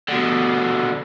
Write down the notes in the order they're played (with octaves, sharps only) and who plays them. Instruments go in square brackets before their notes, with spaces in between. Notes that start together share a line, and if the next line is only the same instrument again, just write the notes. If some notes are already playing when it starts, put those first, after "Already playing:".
[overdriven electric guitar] B2 D3